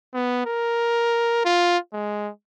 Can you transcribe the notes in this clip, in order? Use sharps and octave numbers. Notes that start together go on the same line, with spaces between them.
B3
A#4
F4
G#3